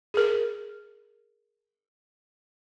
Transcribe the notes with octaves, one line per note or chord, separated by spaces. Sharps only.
G#4 A#4